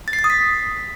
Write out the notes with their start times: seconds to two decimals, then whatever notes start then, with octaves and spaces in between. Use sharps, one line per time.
0.08 A6
0.13 C7
0.19 A6
0.24 D#6
0.30 B6